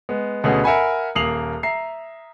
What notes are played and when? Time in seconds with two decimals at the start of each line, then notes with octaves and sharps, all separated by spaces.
0.09 G#3 B3
0.44 D2 B2 B3 C#4 G#4
0.64 A#4 E5 F#5 G#5 B5
1.15 D#1 A#3 D#6 C7 F7 F#7
1.63 E5 A#5 C7